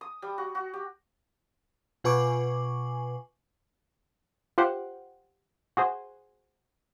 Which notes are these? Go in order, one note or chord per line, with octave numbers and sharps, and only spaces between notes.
D#6
G3
F#4
F#4
G4
B2 F4 B4 G#5 C#6 D6
F4 G4 C5 F#5
F#4 G#4 C5